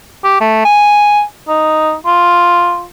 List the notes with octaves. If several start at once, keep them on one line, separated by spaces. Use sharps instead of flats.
G4
A3
G#5
D#4
F4